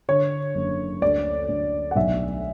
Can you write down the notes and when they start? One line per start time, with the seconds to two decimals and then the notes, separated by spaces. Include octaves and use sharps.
0.08 D3 C#5
0.55 F#1
1.02 D2 D5
1.49 D2
1.91 F#5
1.96 B1 E5